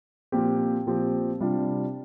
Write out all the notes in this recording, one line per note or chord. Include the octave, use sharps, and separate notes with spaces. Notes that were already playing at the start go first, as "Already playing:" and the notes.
A#2 F3 C4 G4
A#2 F3 C4 G4
C3 G3 D4 F4